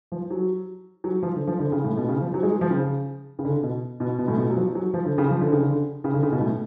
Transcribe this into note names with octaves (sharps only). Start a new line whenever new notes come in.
F3
F#3
F#3
F3
D3
F3
D3
C#3
A2
B2
C#3
F3
F#3
G#3
F#3
F3
C#3
C#3
D3
B2
B2
B2
A2
B2
F#3
F3
F#3
F3
D3
C#3
F3
D3
C#3
D3
C#3
D3
C#3
B2
A2